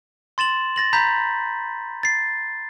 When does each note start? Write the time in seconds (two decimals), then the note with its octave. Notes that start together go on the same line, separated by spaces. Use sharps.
0.38 C6 A6 E7 F#7
0.76 A6 A#6 F#7
0.93 A#5 B5 G6 B6
2.03 A6 C7